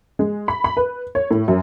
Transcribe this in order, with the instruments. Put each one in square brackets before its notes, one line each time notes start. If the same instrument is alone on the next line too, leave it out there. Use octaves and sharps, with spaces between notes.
[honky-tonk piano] G#3
B5
B5
B4
C#5
A2
F#2